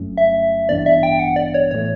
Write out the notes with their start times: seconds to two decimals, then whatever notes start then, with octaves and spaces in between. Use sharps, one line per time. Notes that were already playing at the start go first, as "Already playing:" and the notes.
Already playing: G1 G2 F#3 A3 C#4
0.17 E5
0.69 A1 G2 E3 B3 D4 D5
0.86 E5
1.03 G5
1.19 F#5
1.36 D5
1.54 C#5
1.71 A2 E3 A3 C#5